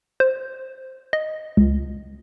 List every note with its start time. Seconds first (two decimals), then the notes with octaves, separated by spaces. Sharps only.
0.20 C5
1.13 D#5
1.57 C#2